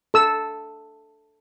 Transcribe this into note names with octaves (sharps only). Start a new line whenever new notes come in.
A4 E6